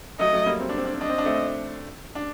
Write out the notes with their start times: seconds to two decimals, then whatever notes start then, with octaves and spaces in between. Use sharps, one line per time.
0.19 F#3 A3 D#5
0.33 F#3 A3
0.46 G3 A#3
0.60 C4
0.69 D4
0.77 C4
0.85 D4
0.94 C4
1.01 D4 D#5
1.09 C4
1.18 D4
1.26 A3 C4
2.15 D4